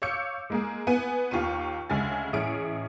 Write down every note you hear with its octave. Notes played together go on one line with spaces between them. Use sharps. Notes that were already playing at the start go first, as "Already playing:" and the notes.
C#5 F5 D6 E6 G6 C#7
G#3 A#3 G#4
B3 G#5 D#7
D#2 F4 G4 C#6 D#7
D2 C#3 G#3 G#5 A6
A1 C#4 G#4 E5 F6 D7